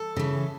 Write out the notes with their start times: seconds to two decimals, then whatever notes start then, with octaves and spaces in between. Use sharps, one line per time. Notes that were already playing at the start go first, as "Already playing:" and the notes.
Already playing: A4
0.17 C#3 E3